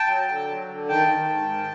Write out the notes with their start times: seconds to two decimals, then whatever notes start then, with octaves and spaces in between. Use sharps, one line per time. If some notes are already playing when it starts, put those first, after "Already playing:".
Already playing: G5 A5
0.08 F#3
0.28 D3
0.48 F#3
0.68 D3
0.89 D#3 G5 A5
1.09 D#3
1.29 G#2
1.49 D#3